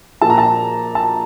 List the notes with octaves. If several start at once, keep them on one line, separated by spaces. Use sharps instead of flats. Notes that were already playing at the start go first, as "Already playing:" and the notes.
A#2 F3 A5
A#5
A5
A5